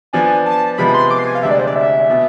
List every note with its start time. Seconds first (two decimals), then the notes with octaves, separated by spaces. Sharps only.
0.13 F3 B3 D4 G#5
0.46 A5
0.78 C3 F3 G#3 B3 B5
0.94 C6
1.11 D6
1.19 C6
1.27 G#5
1.35 F5
1.43 D2 C3 G#3 D4 E5
1.51 D5
1.59 C5
1.67 D5
1.76 E5
2.10 B2 B3